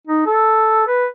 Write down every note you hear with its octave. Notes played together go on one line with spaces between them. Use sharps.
D#4
A4
B4